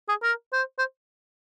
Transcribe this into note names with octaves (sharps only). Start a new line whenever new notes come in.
G#4
A#4
C5
C5